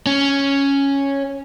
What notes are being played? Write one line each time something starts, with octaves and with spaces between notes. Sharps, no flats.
C#4